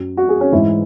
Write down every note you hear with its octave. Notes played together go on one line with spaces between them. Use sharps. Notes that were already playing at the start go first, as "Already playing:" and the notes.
Already playing: F#2 F#3
F#4
G#4
C#4
G#2 E3 E4